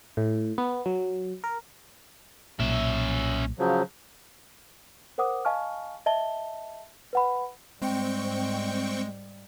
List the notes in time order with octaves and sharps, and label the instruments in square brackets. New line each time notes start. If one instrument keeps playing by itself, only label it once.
[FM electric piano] A2
B3
F#3
A#4
[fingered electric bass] B1 A#2 [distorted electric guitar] C#4 E5
[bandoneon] C#3 F3 F#3
[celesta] A#4 C5 F#5 D6 D#6
D#5 F5 G#5 A5 C#6 F6
D#5 E5 A5 G7
B4 F#5 B5
[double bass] G#2 G3 [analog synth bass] G#3 [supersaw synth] C4 G5 C#6